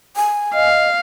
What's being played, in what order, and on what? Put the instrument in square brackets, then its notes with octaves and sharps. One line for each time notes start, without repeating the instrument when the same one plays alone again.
[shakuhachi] G#5
[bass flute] D#5 [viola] F5